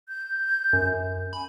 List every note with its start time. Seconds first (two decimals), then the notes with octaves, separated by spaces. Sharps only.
0.09 G6
0.73 F#2
1.33 G#5 B5